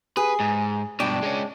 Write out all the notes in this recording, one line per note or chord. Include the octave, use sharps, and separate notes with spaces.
G#4 B4
G#2
G2 B2 D4 G5
G#3 C#4